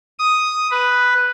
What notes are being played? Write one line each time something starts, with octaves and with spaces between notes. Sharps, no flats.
D#6
B4